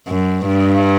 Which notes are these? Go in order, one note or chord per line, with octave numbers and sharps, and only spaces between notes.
F#2
G2